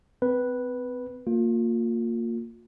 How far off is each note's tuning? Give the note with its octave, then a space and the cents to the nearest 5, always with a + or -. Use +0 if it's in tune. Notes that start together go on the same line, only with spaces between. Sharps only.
C4 -35 B4 -5
A#3 -20 F4 +30